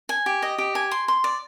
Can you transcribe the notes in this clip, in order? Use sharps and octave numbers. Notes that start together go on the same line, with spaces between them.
G#5
G4
D#5
G4
G#5
C6
C6
D5